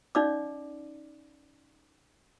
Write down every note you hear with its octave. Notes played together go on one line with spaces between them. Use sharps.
C#4 D#4 D5 D#5 F5 D6